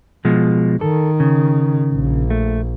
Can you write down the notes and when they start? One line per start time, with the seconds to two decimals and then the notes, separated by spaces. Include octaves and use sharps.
0.25 B2 F3 G#3
0.81 D#3 A4
1.20 C#3
1.93 A#1
2.30 A3